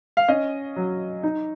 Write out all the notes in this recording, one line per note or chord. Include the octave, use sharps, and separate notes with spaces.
F5
C#4 D#5
F#3
D#4